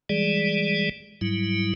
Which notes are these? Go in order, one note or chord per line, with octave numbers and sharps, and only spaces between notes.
E3 G3 G#3 G#4 D5
G#2 F#3 G3 E4